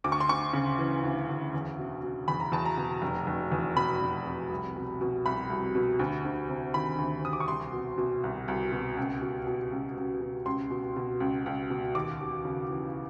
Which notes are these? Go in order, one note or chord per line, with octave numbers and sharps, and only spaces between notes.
D2 D6
C#6
C6
D2 C#6
C#3
E3
D2
D2
E2
B2
B2
E2 B5
A#5
E2 A5
A#5
B2
F1
F1
E2
B2 B5
F1
F1
C2
B2
B2
C2 B5
C2
B2
D2
D2
C3
D#3 B5
D2
D2 D#6
D6
C#6
C2 C6
B2
B2
C2
C2
B2
C#2
B2
B2
C#2
C#2
B2
C#2 C6
B2
B2
C#2
C#2
B2
D#2 D6
D#2
C#3
E3